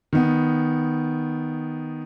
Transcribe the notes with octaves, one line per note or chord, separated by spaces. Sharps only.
D#3 B3